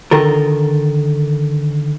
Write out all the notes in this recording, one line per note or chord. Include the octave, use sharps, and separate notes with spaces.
D3 D#3 A4 A#4